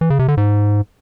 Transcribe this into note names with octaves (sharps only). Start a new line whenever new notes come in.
E3
C#3
C3
D3
G#2